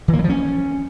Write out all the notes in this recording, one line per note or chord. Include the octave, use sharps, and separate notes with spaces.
E3
A#3
F#3
F3
C#4